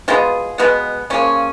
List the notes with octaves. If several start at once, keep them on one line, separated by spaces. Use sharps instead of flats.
B2 G#3 B3 F4 G#4
B2 G#3 B3
C#3 F3 A#3 C#4